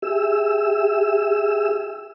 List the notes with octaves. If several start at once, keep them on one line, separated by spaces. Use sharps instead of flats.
G4 G#4 E5 E6